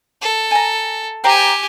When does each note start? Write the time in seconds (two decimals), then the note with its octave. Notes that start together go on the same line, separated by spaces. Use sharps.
0.21 A4
0.51 G#5 A#5
1.24 G4 C5 G5 G#5 A#5